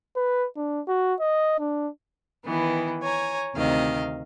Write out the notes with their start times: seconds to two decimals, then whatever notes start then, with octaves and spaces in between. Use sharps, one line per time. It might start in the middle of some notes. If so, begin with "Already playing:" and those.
0.16 B4
0.56 D4
0.88 F#4
1.20 D#5
1.59 D4
2.44 D#3 E3 B3
3.02 C#5 G#5 A#5
3.55 D2 C3 D#3 D#5 F5